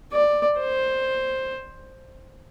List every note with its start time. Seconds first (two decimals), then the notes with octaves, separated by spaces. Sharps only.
0.13 D5
0.58 C5